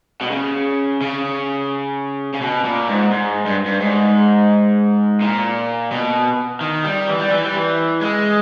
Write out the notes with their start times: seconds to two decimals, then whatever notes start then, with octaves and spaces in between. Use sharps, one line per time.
0.21 B2
0.31 C#3
1.01 C#3
2.33 C#3
2.41 B2
2.64 A#2
2.88 G#2
3.11 G#2
3.46 G2
3.66 G2
3.81 G#2
5.21 A#2
5.91 B2
6.61 D#3
6.84 G3
7.08 E3
7.19 G3
7.30 E3
7.43 G3
7.54 E3
8.01 G#3